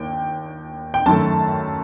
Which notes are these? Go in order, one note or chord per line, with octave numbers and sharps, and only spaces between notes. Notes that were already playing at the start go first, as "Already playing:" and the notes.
Already playing: D#2 G5
G5
F#2 D#3 A3 A5